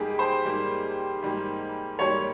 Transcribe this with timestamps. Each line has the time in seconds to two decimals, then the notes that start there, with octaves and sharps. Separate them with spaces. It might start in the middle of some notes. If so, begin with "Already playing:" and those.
Already playing: G#2 G3 A#3 G4 G#4
0.19 C5
0.45 G#2 G3 A#3
1.23 G#2 G3 A#3
1.99 G#2 G3 A#3 C#5